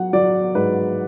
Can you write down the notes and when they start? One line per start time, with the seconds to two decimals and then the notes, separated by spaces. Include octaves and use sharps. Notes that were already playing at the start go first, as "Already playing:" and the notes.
Already playing: F#3 F#5
0.13 F#3 D5
0.55 G#2 B4